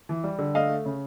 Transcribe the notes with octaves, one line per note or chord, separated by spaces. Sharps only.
E3
G3
D3
A3 D#5 F5
A3
C#3